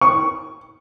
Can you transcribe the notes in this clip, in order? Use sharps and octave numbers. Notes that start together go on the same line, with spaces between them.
C#6